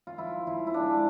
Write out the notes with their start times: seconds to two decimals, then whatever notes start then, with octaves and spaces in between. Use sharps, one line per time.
0.07 F4
0.18 F3 E4
0.47 F3 E4
0.67 E4
0.74 G#2 D4